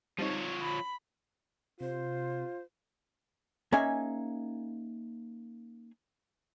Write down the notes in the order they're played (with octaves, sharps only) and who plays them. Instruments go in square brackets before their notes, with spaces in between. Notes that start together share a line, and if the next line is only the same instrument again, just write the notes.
[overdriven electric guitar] F3 C#5 [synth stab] G3 C4 D#4
[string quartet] B5
[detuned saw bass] C3 [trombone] F4 [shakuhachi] C5
[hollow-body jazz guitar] A#3 C#4 D#4 G#4 E5 G#5